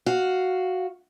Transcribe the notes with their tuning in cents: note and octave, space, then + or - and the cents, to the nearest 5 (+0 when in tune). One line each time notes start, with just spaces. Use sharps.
F#4 +0 F5 +0